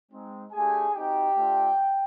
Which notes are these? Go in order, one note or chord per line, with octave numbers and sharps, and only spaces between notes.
G#3 C4 D#4
A3 D4 G4 G#4 G#5
C4 D#4 F#4 G4 G5
A3 D4 F4